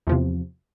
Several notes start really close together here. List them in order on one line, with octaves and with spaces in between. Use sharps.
E2 F3 C3